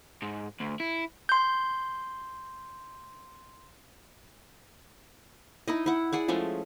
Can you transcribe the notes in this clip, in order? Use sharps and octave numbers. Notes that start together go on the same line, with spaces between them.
G#2
D2
E4
C6 G6
D#4 E4 D#5
E4 F#5
G#4 D5 F#5
F3 G#3 A3 C#4